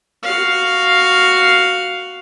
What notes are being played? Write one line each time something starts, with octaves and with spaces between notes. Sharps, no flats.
F#4 F5